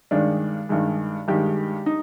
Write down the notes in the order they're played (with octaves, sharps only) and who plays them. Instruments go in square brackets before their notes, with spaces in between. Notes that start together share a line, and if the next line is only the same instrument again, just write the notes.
[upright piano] G2 D#3 G#3 D4
G2 D#3 G#3
G2 D#3 G#3 G4
D#4